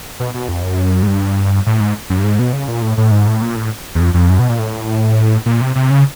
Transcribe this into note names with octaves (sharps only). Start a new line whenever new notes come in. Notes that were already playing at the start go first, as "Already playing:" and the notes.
B2
B2
F2
F#2
G#2
G2
A2
G#2
F#2
G2
G#2
B2
C#3
A#2
A2
A2
G#2
A2
A#2
A2
E2
F2
F2
F#2
B2
A#2
A2
A#2
C3
C3
C#3